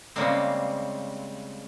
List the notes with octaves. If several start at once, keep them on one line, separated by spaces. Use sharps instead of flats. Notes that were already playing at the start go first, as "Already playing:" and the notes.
C#3 G3 G#3 A#3 C4